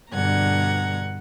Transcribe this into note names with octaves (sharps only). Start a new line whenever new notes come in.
G2 B2 D3 F#5 A#5 G#6